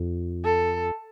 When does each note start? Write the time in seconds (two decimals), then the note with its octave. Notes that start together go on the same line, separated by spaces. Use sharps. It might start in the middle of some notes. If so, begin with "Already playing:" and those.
Already playing: F2
0.45 A4